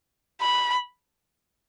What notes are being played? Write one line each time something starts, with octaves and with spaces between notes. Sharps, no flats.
B5